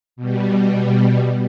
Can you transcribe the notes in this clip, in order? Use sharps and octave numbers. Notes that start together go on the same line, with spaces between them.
B2 G3